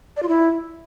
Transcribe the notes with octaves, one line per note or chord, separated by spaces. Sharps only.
D5
F4
E4